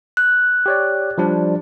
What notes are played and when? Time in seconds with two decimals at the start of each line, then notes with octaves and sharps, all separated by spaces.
0.17 F#6
0.66 G4 C#5 D5
1.18 F3 G3 D4